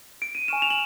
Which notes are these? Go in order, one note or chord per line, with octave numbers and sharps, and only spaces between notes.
D7
D#7
G#5 C#6 F6 E7
F7
F#7